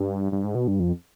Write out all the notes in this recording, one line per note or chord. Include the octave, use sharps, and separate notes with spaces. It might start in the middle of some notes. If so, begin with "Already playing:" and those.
Already playing: G2
G2
G#2
B2
G2
F2